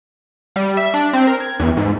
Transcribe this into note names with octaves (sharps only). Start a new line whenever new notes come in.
G3
E5
D4
C4
A#4
G#6
E2
G#2